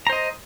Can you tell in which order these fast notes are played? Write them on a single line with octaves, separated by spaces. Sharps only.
A#5 C5 D#5